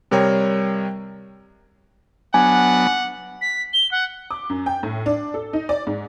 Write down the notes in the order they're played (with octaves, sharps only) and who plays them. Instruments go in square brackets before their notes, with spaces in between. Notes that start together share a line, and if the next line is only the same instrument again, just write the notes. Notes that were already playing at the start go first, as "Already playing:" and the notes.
[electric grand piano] C3 G3 A#4 C#5 G5
[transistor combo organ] F#3 B3 D4 [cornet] F#5 [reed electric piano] G#5
[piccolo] B6
G7
F#5
[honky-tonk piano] D6
F#2
G5
A2
D4
A4
D#4
D5
G#2